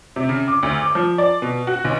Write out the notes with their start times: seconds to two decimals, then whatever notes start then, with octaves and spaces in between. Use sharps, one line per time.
0.16 C3
0.29 C#3
0.48 D6
0.63 D2
0.81 D6
0.95 F3
1.18 D5
1.42 B2
1.67 F#4
1.84 B1